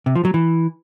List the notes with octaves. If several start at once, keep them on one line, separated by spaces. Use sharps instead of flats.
C3
F3
F#3
E3